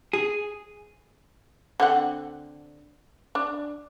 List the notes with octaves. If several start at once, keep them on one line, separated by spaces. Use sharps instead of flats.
G#4
D3 C4 F#5
D4